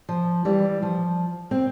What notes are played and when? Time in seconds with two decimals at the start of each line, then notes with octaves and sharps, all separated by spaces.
0.09 F3
0.45 E3 G3
0.82 F3
1.51 C4